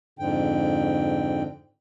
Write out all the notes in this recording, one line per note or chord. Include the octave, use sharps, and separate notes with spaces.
F2 G#2 D3 G5